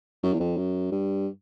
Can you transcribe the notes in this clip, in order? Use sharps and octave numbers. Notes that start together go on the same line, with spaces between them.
F#2
E2
F2
F#2
G2